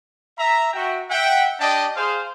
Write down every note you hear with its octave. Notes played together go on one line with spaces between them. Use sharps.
E5 A#5
F#4 E5 G5
E5 F#5 G5
D4 G4 D5 D#5 G5 A5
G#4 C5 F5